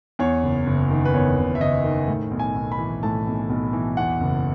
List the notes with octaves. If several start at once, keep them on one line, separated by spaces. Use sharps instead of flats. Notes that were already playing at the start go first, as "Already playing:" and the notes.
E2 C#5
F#1
F#1
D#3
B4
E2 C#5
F#1
E5
F#1 D#5
D#3
A2
B1
G#5
B1
B5
E3
A2 A5
B1
B1
E3
E2 F#5
F#1